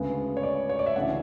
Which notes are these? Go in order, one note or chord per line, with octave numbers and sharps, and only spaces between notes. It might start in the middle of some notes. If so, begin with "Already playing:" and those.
Already playing: D2 C#3 G#3 B3
C#5
D5
C#5
D5
E5
D2 C#3 E3 F#5